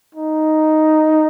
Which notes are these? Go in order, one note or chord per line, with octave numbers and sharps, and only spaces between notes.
D#4